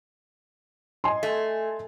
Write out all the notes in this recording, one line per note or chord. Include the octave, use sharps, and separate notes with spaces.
D#5 G#5 C6
A3